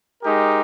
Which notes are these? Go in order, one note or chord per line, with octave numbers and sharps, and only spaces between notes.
G#3 D#4 G4 A#4